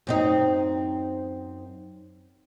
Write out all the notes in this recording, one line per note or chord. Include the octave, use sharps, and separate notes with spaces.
F#2 C4 D#4